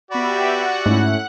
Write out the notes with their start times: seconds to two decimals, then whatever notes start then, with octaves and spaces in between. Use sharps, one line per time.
0.11 B3 F#4 G4 D5 E5 B5
0.49 F#5 F#6
0.86 G#2 A3 C#4 E4